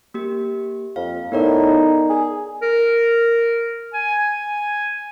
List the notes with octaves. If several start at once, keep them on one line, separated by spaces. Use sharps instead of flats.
A#3 G4
F2 F5
A2 B3 D#4 A#4 D5
G#4
A#4
G#5